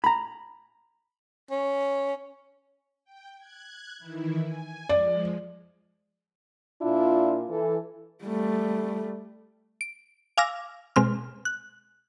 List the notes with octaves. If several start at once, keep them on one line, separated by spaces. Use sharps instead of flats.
A#5 B5
C#4
G5
F#6 G#6
D#3 E3 E4
G#5
F3 G#3 D5
A#2 D4 E4 F4
E3 A4
G3 A3
D7
F5 G#5 D6 E6 F6 A#6
B2 G#3 C4 F6
F#6